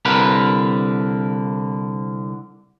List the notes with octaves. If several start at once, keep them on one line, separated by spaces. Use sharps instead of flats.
C2 D3 A#4 B4